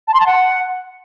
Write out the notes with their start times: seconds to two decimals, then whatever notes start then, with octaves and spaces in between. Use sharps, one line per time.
0.08 A5
0.14 C6
0.20 A5
0.26 F#5